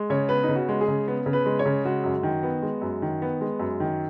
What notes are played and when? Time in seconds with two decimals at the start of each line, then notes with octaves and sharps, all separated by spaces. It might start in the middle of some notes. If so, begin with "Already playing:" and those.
Already playing: G#3
0.10 C#3 C#5
0.29 B3 B4
0.43 D#4
0.48 C#3
0.55 F#4
0.69 G#3
0.81 G#4
0.88 C#3
1.08 B3
1.26 C#3
1.33 B4
1.46 G#3
1.59 C#5
1.66 C#3
1.84 G#3 F#4
2.04 F#2
2.23 D#3
2.43 B3
2.62 G#3
2.82 F#2
3.02 D#3
3.22 B3
3.41 G#3
3.60 F#2
3.80 D#3